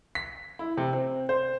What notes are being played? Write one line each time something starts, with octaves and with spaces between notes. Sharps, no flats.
B6
E4
C3
C4
C5